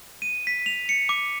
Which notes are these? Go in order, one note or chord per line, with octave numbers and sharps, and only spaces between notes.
D#7
B6
F7
C#7
D6